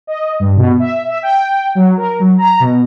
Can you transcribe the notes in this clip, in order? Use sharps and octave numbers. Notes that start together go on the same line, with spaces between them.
D#5
G2
B2
E5
E5
G5
F#3
A#4
F#3
A#5
B2